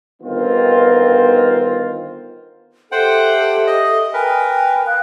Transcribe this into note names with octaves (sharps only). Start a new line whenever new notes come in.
G1 D#3 B3 C4 F4
G4 A4 C5 E5 F#5 G5
D#5
A#4 B4 G5 G#5
F5 D#6 F#6